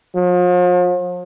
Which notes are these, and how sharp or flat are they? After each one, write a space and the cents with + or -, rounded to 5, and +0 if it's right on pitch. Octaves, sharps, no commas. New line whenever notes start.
F3 +40